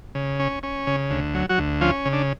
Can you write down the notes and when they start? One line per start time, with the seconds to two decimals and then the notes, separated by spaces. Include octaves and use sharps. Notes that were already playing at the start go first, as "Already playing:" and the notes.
0.15 C#3
0.40 C#4
0.63 C#4
0.87 C#3
1.10 D2
1.34 F#3
1.49 F#3 F#4
1.58 D2
1.81 F3 C#4 F4
2.05 C#3
2.13 D4